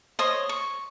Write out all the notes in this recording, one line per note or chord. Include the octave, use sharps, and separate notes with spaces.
C5 C#5 D#5 D#6
C#6